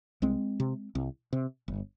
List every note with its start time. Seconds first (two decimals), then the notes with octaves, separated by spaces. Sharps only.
0.22 C2 G#3 C4
0.60 C3
0.95 C2
1.33 C3
1.68 G1